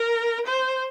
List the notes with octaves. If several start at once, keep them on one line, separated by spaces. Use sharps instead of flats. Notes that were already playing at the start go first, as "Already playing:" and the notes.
Already playing: A#4
C5